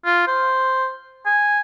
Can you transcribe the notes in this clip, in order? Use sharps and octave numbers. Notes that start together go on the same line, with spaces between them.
F4
C5
G#5